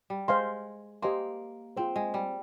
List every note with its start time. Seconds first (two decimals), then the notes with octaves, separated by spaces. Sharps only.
0.10 G3
0.28 G#3 C5 F5 C6
1.02 A#3 G4 C5 D#5 G#5 C6
1.77 C4 F4 G#4 C5
1.96 G#3
2.14 G3